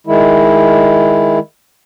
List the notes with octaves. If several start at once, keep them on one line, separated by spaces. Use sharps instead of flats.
D#3 G#3 E4